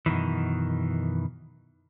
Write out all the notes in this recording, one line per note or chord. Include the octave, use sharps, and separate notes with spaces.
F#2 B2 D#3 E3